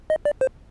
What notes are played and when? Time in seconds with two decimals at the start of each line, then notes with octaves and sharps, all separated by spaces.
0.10 D#5
0.25 D5
0.41 C5